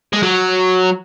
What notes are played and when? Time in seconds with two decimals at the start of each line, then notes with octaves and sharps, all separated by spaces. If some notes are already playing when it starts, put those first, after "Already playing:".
0.13 G#3
0.23 F#3